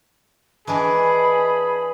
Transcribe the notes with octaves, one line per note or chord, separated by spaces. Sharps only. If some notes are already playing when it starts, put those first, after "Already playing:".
E3 D4 G#4 A#4 D#5 G#5 A5 B5